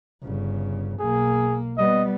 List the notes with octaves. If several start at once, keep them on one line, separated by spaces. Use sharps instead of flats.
G1 C#3
B1 A#3 G#4
G3 B3 D#5